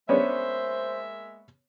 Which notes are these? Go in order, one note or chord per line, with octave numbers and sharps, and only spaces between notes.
G#3 A#3 B3 C#4 D4 C5 C#5 E5